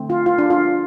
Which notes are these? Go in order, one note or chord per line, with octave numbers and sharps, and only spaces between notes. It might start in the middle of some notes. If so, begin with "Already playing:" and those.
Already playing: D3 A3 C4
F4
F4
D4
F4